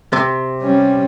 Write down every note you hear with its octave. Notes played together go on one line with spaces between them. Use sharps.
C3
G3 C#4